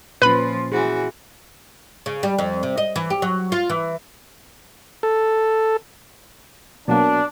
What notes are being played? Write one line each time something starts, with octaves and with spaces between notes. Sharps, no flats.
A#2 F3 C#4 F4 B4 B5
E3 F#4 G#4 C5
C#3
G3
F2
C3
D#5
E3
G4
F#3
F4
E3
A4
B2 F#3 A#3 D4